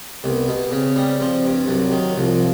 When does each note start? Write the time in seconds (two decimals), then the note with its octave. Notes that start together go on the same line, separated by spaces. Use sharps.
0.24 C2 B3
0.48 B2
0.72 C#3 C4
0.96 G3
1.20 F3 C4
1.45 G2
1.68 C2 F#3
1.91 D#3
2.16 C2 F3